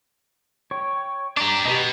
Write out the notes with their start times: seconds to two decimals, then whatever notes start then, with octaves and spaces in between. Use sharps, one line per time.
0.71 C#5 G5
1.37 D4 G4 A#5 D6
1.66 B2 G4 B4 D#5